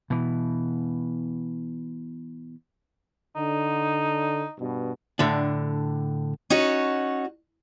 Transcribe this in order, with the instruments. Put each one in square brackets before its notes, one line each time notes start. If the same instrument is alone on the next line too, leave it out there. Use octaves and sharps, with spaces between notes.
[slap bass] B2 E3
[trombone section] D3 [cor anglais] D#4
[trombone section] G2 B2
[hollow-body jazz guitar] A2 D3 D4
[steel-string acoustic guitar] C#4 D#4 F#4 C#5